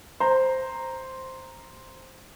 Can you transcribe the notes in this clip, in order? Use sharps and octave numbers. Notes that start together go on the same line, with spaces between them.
C5 A#5